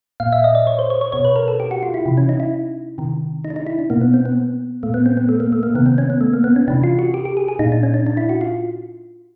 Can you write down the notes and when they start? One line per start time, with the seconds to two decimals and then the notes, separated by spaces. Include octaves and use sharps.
0.20 A#2 F5
0.32 E5
0.44 D#5
0.55 D5
0.67 C#5
0.79 C5
0.90 C#5
1.01 C#5
1.12 B2 C#5
1.25 B4
1.36 A#4
1.48 A4
1.60 G4
1.71 F#4
1.83 F4
1.94 E4
2.06 C3 E3
2.17 C#4
2.29 D#4
2.40 E4
2.98 C3 D#3
3.45 D#4
3.50 D4
3.56 D#4
3.67 E4
3.79 D4
3.90 B2 A#3
4.01 B3
4.14 C4
4.25 B3
4.83 A#2 A3
4.94 B3
5.06 C4
5.17 B3
5.29 A3
5.40 A#3
5.52 A3
5.63 A#3
5.75 C3 D#3 B3
5.86 C4
5.98 C#4
6.10 B3
6.21 A3
6.33 A#3
6.44 B3
6.56 C#4
6.68 C3 E3 D4
6.84 F4
6.99 F#4
7.14 G4
7.25 G4
7.37 G#4
7.48 G#4
7.59 A#2 D#4
7.72 D4
7.83 C#4
7.94 D4
8.06 D4
8.17 E4
8.29 F#4
8.41 F4